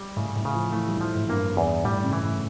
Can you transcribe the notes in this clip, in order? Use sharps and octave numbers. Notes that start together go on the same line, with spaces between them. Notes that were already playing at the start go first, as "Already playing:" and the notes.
Already playing: G3
A2 C#3
A2
C#3
F3
E3 A3
G3
E3 F3
A2
G2 A#3
E2
A2 G3
C#3
E3
A2